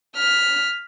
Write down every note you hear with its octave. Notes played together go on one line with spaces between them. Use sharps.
F6 B6